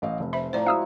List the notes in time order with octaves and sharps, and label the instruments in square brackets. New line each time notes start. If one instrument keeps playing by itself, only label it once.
[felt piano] A1 D#5 F5
F1
[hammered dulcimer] C5 [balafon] E5 [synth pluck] B5
[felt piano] A2 [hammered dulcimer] F3 A#5 D6 [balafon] C5 D5
[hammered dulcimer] G#3 [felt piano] E4 F#4 [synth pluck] F5 D#6 E6